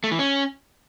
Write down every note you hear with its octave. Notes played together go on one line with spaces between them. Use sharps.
A3
E3
C#4